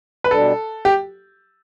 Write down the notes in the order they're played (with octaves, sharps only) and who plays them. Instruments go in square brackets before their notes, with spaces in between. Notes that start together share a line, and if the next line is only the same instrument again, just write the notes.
[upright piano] B4
[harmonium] B2 G3 D4 [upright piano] A4
[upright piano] G4